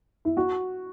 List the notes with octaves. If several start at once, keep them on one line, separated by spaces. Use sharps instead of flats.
E4
F#4